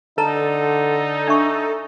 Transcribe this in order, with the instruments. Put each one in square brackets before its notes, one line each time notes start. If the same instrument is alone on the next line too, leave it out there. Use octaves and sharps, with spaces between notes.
[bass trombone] D3 [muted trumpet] D#4 [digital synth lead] A4 [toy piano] B4 A5 A#5
[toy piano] D4 E5 C#6